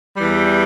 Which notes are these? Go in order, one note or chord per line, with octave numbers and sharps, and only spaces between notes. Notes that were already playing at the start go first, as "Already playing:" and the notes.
E2 E3 G3